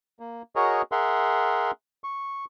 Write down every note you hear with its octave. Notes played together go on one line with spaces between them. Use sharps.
A#3
F#4 G#4 A#4 C#5 D#5
G#4 A#4 E5 F#5 C6
C#6